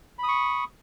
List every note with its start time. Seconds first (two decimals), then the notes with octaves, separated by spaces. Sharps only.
0.18 B5
0.23 D#6
0.28 C#6